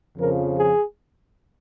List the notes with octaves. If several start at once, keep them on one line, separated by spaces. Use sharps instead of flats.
F2 C#3 F3 A#4
G#4